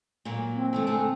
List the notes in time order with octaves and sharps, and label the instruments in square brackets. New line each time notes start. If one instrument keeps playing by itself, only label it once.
[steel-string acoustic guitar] A#2 F#3 A#3
[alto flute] C4
[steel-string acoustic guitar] E3 G#3 A3
D3 A3 G#4